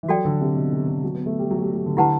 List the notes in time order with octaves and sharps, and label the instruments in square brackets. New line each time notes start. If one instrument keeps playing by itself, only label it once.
[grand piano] E3
[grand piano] F#3 [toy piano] F#4 A4 D5 G5
[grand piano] D3
C3
B2
C3
D3
F#3
B3
A3
G3
F#3
A3
G3
F#3
D3
[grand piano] D3 [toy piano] E4 G4 B4 F#5 A5